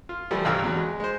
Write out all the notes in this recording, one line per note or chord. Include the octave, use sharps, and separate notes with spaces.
F4
E3 F3 G3 A3
G#1 D2 G2 F5 A#5 E6
E2 F#3
G#3
G#3 C5